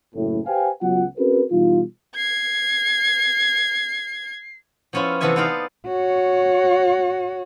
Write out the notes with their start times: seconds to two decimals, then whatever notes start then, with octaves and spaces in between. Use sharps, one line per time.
0.15 F#1 A2
0.47 G4 B4 C5 F5 G5 G#5
0.82 C#2 F#3 B3 F4 F#5
1.18 C4 C#4 F#4 G#4 A#4 B4
1.51 B2 E3 G3 D#4 F4
2.17 G#6 C7
4.93 F3 B3 C#4 E4 F4
5.21 C3 E3 B3 A4 E5 G#5
5.36 B3 D#4 C5 D5 F5
5.88 F#4 C#5